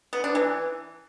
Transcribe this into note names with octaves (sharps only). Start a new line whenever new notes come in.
B3
D4
E3